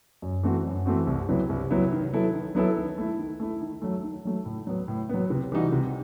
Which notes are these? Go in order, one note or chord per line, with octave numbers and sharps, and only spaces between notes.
F#2
E3 A3 C4 F#4
F#2
E3 A3 C4 F#4
C2
C3 F#3 B3 E4
C2
C3 F#3 B3 E4
D#3
F#3 B3 E4 A4
D#3
F#3 B3 E4 A4
D#3
A3 E4
D#3
A3 E4
D#3
F#3 A3
D#3
F#3 A3
A2
F#3 B3
A2
F#3 B3
C3
E3 G3 D#4 F#4
C3